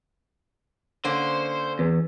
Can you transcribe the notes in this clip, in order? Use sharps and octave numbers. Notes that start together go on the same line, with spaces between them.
D3 A#3 C#4 C5
E2